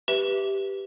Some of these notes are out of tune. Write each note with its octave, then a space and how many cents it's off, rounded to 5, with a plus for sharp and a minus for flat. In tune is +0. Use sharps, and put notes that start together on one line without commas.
G4 +0 B4 +0 E5 -5